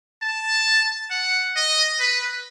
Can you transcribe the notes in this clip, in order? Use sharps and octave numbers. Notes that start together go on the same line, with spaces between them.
A5
F#5
D#5
B4